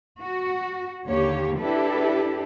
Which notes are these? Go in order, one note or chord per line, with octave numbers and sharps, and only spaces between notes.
F#4
D#2 D3 A#3 G4 C#5
D4 E4 G4 A4 B4